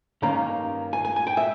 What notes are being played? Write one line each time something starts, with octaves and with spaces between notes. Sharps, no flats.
G2 D#3 A#3 C#4 A#5
G#5
G#5
G#5
G5
E5